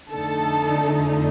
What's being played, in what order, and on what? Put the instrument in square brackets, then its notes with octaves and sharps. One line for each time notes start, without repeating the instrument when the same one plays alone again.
[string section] F2 D3 A3 D#4 A4